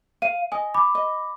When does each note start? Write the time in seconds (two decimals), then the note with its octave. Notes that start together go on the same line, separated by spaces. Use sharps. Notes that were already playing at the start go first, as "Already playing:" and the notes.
0.22 F5 D#7
0.52 D#5 G#5 D#6
0.74 B5 D6
0.95 D#5